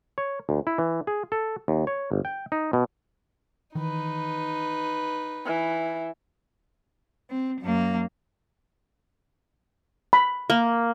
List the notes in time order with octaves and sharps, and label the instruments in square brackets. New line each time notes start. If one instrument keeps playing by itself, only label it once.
[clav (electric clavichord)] C#5
D2
E4
E3
G#4
A4
D#2
C#5
G1
G5
D#4
B2
[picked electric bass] D#3 E3 [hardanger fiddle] D#4 B4
[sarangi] E3
[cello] C4
F#2 A#3
[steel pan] B5
[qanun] A#3